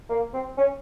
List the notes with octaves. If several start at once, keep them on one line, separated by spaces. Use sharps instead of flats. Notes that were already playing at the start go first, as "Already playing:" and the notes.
A#3
C4
C#4